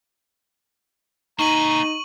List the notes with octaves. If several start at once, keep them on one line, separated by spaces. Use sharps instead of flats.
A#3 D#4 G#5 A#5 C#6 D#7 F#7